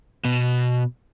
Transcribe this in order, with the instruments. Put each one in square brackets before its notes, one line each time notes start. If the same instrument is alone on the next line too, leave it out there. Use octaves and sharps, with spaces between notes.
[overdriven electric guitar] B2